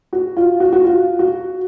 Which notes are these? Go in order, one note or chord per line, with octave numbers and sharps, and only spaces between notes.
F#4
F4
F#4
F#4
F4
F#4